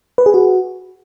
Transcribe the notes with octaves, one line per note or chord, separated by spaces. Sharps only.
B4
G#4
F#4